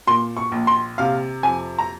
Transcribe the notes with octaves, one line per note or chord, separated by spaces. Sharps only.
A#2 C6
C#6
A#1
C6
C3 F5
F2 G#5
A#5